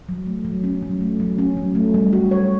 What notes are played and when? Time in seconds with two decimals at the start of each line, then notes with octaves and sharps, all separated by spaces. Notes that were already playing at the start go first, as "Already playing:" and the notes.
0.09 F#3
0.27 A3
0.45 F#3
0.64 C#4
0.82 F#3
1.01 A3
1.20 F#3
1.38 C#4
1.57 F#3
1.75 A3
1.94 G3
2.13 F#4
2.31 C#5